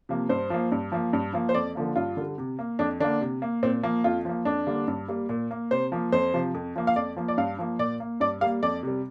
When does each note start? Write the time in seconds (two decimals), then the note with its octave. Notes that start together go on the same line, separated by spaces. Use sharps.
0.09 C3 F3 A#3
0.29 G2 C5
0.50 F3 A#3
0.72 G2
0.92 F3 A#3
1.13 G2
1.33 F3 A#3
1.49 C5
1.54 F2 D5
1.75 D3 F3 A#3
1.96 G2 F4
2.17 D3 G3
2.38 C3
2.59 A#3
2.79 F2 D4
3.00 D3 A#3 D4
3.21 C3
3.42 A#3
3.63 A#2 C4
3.83 F3 A#3
4.04 F2 F4
4.25 F3 A#3
4.45 F2 D4
4.67 D3 G3 A#3
4.88 G2
5.08 G3 A#3
5.29 A#2
5.51 A#3
5.71 C3 C5
5.92 F3 A#3
6.12 F2 C5
6.34 C3 F3
6.54 F2
6.76 F3 A#3
6.87 F5
6.96 F2 D5
7.17 F3 A#3
7.28 D5
7.38 G2 F5
7.58 F3 A#3
7.79 A#2 D5
8.00 A#3
8.20 G2 D5
8.41 G3 A#3 F5
8.62 F2 D5
8.83 C3 G3